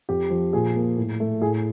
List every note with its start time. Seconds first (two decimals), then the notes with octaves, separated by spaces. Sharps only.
0.09 F2 G4
0.30 F3
0.53 A#2 G#4
0.75 A#3
0.97 A2
1.20 A3
1.41 A2 G#4